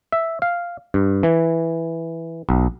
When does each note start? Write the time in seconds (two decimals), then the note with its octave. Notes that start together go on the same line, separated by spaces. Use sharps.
0.12 E5
0.42 F5
0.94 G2
1.23 E3
2.49 B1